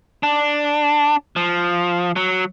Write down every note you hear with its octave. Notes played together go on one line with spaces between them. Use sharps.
D4
F3
F#3